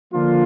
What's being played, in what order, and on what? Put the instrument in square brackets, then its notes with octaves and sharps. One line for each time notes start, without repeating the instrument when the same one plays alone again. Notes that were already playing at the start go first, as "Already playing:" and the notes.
[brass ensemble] D3 F3 A#3 D4 F4